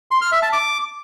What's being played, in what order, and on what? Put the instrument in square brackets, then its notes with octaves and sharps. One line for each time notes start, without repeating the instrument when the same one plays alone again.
[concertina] C6
F6
E5
A5
D6